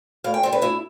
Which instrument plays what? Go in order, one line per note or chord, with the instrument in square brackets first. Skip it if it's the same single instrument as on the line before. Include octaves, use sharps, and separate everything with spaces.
[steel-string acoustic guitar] A2 F5
G5
G3 C4 C5
B4
A2 E4